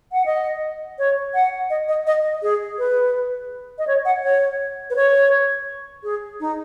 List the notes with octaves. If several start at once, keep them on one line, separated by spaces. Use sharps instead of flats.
F#5
D#5
C#5
F#5
D#5
D#5
D#5
G#4
B4
D#5
C#5
F#5
C#5
B4
C#5
G#4
D#4